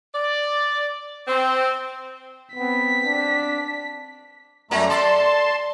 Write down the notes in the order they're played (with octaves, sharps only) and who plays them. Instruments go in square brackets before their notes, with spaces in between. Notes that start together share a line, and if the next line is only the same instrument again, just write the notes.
[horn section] D5
C4
[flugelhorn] B3 [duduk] C4 [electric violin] B6
[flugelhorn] D4
[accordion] F#2 A3 A#5 [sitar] G3 A#3
[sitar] A4 D5 [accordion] A5 C6